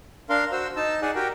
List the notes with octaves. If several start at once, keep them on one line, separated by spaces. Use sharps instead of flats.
D4 A#4 F5 C6
F#4 C5 E6
D#4 A5 E6
D#4 G#4 D5 F#5 G#5
F#4 G4 A#4 G5